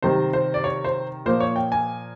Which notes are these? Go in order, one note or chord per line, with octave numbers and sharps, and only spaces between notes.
C3 D#3 G3 C4 C5
C5
D5
C#5
C5
A#2 F3 A#3 C5
C#5
G5
G#5